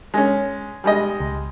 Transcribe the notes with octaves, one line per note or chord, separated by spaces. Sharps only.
G#3 C#4
G3 G#3 D#5
C#2